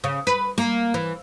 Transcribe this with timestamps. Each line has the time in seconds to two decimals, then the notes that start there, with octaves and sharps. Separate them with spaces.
0.04 C#3
0.27 B4
0.58 A#3
0.94 E3